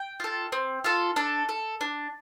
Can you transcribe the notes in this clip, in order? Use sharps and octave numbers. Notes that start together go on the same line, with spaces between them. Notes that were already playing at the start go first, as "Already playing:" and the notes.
Already playing: G5
F4 A4
C4
F4 A4
D4 A4
A4
D4